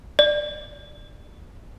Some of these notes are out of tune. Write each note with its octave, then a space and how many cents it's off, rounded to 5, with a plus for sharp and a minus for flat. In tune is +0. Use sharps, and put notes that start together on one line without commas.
D5 +15